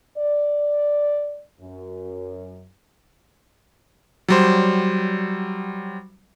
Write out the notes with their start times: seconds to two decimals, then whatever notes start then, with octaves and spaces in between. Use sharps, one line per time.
0.17 D5
1.61 F#2
4.28 F#3 G3 C5